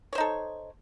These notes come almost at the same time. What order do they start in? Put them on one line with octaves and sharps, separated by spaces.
C#5 C5 D#4 A4